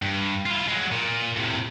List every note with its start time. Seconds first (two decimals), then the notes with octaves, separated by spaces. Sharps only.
0.02 G2
0.46 E4 F4
0.68 F#3 G#3
0.92 A#2
1.37 A2 C3